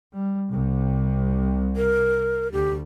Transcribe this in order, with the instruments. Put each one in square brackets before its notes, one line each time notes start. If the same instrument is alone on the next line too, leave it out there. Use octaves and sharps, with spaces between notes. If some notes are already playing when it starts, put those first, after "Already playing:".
[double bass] G3
C2 C3
[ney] A#4
[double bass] D2 [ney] G4